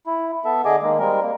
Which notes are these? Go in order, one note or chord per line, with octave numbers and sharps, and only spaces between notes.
E4
B3 A4 E5
D3 G#4 D#5 G#5 D6
D#3 G#3 A#3
G3 G#3 C4 A#4
A#3